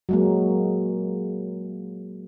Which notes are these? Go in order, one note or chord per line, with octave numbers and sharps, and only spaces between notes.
F#3 G#3 A#3